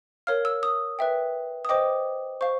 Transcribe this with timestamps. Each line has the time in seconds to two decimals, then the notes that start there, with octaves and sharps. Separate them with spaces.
0.27 A#4 C#5 F5 F6
0.45 E6
0.63 D#6
0.99 B4 E5 G5
1.65 D#6
1.69 C5 D#5 G5 D6
2.41 C5 F5 C#6